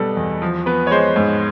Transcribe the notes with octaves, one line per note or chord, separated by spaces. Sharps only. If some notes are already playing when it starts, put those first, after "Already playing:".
Already playing: B2 G3 B3 A4
E2
F3
B3 B4
C#5
G#3 C5
G#2